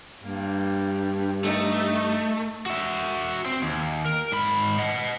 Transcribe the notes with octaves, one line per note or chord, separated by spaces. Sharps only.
G2 A#3
A3 D#4
F#4 E5
C4
D#2
A#4
G#2 B5
D#5 F#5